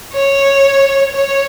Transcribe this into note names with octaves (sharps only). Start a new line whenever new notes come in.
C#5
C#5